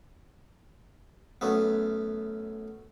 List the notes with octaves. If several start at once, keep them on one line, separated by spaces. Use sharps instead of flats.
F#2 A3 B3